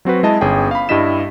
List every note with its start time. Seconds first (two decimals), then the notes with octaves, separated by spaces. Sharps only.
0.05 F#3 C4 F#4 B4
0.23 G#3 E4 D#5 A5
0.41 G1 C#4 G#4 G5
0.71 F5 B5
0.89 G2 G3 E4 D#5 B6 E7